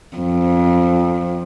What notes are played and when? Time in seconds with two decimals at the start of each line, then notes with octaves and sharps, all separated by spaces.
0.17 F2